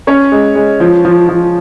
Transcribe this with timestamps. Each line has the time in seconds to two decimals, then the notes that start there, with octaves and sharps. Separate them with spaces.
0.07 C#4 C#5
0.32 G#3
0.55 G#3
0.80 F3
1.05 F3
1.29 F3